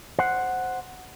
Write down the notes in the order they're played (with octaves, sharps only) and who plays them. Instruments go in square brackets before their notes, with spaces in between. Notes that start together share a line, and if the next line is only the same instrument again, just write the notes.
[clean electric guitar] C5 F#5